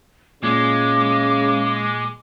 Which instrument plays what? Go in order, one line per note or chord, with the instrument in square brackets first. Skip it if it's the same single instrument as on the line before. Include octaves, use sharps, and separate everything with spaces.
[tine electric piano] A#2 [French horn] C#3 [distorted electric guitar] G#3 [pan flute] D6